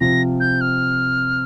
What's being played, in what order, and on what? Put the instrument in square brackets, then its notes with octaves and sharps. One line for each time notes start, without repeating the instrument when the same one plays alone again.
[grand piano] C3 F3 C4 F4 [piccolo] A#6
[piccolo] G6
F6